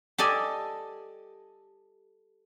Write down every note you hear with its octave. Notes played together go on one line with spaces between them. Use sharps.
G4 A4 D5 D#5 G#5